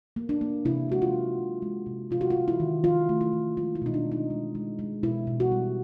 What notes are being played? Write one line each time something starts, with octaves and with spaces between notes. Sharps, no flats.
A#3
D4
A#3
C3 E4
G#3 F#4
F4
G#3
C3
G#3
C3
C3 F4
F#4
F4
C3
E4
D#3
F3 F4
A3
E4
A3
G#3 F4
E4
B2 D#4
D4
G#3
D#4
G#3
G#3
G#3
B2 E4
B2
F#4
G3